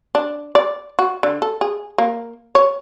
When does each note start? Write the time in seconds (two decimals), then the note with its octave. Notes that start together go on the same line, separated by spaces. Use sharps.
0.15 D4
0.55 D5
0.99 F#4
1.23 D3
1.42 A4
1.61 G#4
1.98 A#3
2.55 C#5